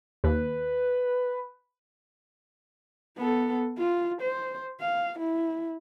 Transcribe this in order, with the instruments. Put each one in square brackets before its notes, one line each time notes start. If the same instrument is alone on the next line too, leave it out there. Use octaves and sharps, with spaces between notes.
[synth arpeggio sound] D#2 [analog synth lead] B4
[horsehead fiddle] B3 A4
F4
C5
F5
E4